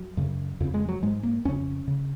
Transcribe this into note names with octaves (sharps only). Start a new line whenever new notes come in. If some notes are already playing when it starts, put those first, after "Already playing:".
Already playing: F#3
F#2 C#3
F2 C#3
G#3
F#3
G#2 G#3
A#3
F2 C#3 C#4
C#3